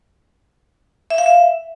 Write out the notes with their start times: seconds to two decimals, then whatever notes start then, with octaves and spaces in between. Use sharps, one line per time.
1.10 E5
1.18 F5
1.26 E5